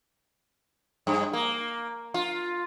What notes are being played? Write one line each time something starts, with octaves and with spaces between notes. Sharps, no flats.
G2
A#3
F4